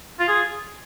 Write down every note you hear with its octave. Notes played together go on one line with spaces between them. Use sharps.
F4
G#4